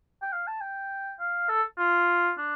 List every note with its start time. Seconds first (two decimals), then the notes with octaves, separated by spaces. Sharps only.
0.22 G5
0.33 F5
0.47 A5
0.61 G5
1.19 F5
1.49 A4
1.78 F4
2.38 D4